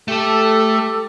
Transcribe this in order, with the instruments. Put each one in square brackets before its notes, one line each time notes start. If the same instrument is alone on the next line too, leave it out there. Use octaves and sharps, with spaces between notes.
[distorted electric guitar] A3 A5 [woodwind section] G4 A4